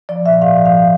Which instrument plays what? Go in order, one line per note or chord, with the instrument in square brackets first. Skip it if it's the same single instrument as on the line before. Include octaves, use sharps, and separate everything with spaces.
[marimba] F3 D5
A#2 E5
G#2 F5
F3
F5